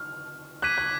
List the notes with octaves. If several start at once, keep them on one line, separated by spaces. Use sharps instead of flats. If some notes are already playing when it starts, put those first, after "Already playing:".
Already playing: F6
D6 F#6 G#6 B6 D#7
F#6